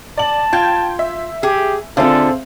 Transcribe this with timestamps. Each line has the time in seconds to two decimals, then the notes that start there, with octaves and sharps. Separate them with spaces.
0.17 D5 A5 F#7
0.53 F4 G5 G6 G#6
0.99 E5
1.43 G4 G#4
1.97 D3 C4 F4 G#4 A4 C5 E5 F5